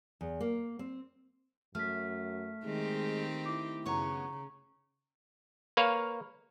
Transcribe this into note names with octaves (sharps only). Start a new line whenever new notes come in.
E2
A#3
C4
F#2 A3 F6 B6
D#3 G#3 C4 G4
E4 D6
F#2 C#3 B3 C#5 A#5 C#6
A#3 B4 C#5 F5